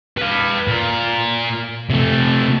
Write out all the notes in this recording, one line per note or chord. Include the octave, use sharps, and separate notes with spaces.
B4 F5
A#2 A#4
C3 A3